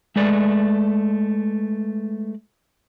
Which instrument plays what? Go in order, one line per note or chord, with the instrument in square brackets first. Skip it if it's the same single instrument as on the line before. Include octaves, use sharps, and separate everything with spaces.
[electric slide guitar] G#3 A3 B4 D5